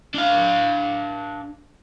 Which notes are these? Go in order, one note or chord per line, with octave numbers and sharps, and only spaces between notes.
D4 F5